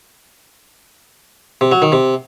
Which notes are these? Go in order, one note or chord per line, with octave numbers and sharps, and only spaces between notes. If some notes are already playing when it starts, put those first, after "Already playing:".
C3
F#3
D#3
C3